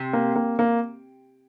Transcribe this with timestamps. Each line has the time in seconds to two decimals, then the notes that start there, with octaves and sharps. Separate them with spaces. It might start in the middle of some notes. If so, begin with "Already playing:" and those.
Already playing: C3
0.13 A#3
0.36 A#3
0.59 A#3